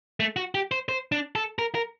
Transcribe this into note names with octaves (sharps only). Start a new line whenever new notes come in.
A3
F#4
G4
C5
C5
D4
A4
A#4
A#4